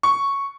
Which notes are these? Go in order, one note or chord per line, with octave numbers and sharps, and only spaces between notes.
C#6